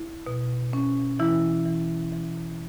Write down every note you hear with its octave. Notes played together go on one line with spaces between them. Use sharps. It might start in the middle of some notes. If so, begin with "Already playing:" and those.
Already playing: E4
B2
C#4
E3 E4
E3
E3